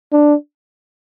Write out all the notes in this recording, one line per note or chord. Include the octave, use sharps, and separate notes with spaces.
D4